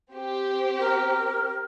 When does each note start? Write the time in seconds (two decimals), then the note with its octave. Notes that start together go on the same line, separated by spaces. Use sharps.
0.12 C4 G4
0.80 A#4